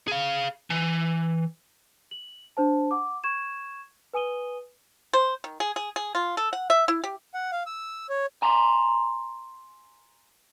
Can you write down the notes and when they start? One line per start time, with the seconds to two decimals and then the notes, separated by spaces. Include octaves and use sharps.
0.08 G#4 F5
0.70 E3
2.11 F#7
2.57 D4 C5 A5
2.91 F#5 D6
3.24 C#6 G#6 E7
4.14 B4 G#5 D#6 D#7 G7
5.13 C5
5.44 D#3
5.60 G#4
5.76 G#4
5.96 G#4
6.15 F4
6.37 A4
6.53 F#5
6.70 E5
6.88 E4
7.04 G4
7.34 F#5
7.52 F5
7.66 E6
8.09 C#5
8.42 G#5 A#5 C6